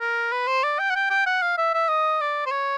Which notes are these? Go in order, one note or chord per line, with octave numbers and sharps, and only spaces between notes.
A#4
B4
C5
D5
G5
F#5
G5
G5
F#5
F5
E5
E5
D#5
D5
C5
C#5